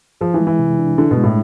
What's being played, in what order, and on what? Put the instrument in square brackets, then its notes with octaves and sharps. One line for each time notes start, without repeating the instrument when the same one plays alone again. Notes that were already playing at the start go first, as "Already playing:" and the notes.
[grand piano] F3 [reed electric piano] G#4
[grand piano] E3
[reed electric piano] G#3
[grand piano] E3
[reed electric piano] C3
D4
[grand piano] D3 [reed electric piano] E4
[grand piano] B2
[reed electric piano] G#3
[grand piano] A2